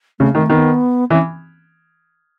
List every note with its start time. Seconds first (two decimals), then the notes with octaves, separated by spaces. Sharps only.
0.19 C#3 A3
0.34 D#3 A3
0.50 D#3 B3
1.10 E3 C#4